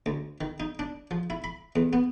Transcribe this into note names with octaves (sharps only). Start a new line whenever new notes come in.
D2
D#3
D#4
D4
F3
E4
B5
E2
B3